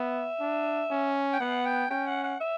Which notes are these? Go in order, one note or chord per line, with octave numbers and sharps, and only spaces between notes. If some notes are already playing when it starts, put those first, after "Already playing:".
Already playing: B3 E5
D4
C#4
G5
B3 F#5
G5
C#4 G5
F#5
F#5
E5